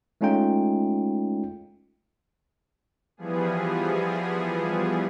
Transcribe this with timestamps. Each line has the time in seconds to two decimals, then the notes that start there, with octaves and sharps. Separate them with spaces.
0.21 G#3 A3 C#4 D#4 F4 G5
3.17 E3 F3 G3 B3 G#4